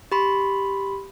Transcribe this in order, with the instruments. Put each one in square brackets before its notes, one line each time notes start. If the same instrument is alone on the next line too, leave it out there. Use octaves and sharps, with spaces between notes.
[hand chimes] G4 B5 C6